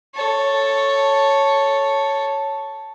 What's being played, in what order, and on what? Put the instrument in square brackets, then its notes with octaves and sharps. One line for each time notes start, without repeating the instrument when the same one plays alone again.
[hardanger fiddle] A4 C#5